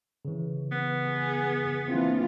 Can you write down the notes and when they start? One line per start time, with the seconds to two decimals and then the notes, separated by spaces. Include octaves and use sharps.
0.25 C#3 E3
0.72 B3
1.05 G#4
1.88 E3 A#3 C4 D4 F4